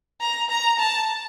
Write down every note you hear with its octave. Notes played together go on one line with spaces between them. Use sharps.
A#5
A#5
A5